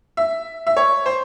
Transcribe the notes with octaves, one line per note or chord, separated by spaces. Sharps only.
E5
E5
C#5
C5